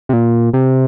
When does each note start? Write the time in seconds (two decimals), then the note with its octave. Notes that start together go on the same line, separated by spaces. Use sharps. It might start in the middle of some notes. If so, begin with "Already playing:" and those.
0.09 C3
0.13 A#2
0.53 C3